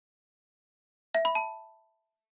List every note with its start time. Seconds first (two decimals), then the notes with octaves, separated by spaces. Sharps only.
1.15 E5
1.25 B5
1.35 A5